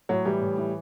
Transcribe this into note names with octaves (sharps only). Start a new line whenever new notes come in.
A2 F#3
E3 G3
A2
E3